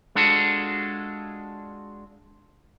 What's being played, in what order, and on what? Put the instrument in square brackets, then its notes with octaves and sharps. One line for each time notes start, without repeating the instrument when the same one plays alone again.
[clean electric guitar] G#3 D4 F4 F#4 A4